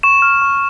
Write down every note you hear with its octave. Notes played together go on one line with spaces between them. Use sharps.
C#6 E7
F6
C#6